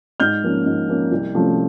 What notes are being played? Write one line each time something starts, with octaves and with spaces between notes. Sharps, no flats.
G#2 F6 G6
F3 A#3 C#4
G#2
F3 A#3 C#4
C2
C3 F3 A3 C#4